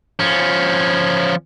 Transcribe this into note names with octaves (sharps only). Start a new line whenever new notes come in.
F3 C#4